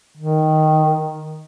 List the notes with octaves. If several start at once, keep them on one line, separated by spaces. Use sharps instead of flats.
D#3